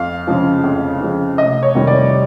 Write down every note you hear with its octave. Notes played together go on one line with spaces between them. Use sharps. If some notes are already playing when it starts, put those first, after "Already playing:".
Already playing: F2 F5
C#3 F3 G#3
F2
C#3 F3 G#3
F1 D#5
C#5
F2 C3 D#3 G3
D5